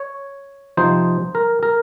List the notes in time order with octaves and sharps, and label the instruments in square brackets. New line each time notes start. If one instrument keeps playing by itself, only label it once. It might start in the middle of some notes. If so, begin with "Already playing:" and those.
Already playing: [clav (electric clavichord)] C#5
C3 F3 C4 D#4 C5
A#4
A#4